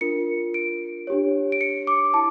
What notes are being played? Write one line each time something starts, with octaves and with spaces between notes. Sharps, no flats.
D4 F4 A#4 C#7
D7
D4 G4 C#5
D7
C#7
D6
E4 A5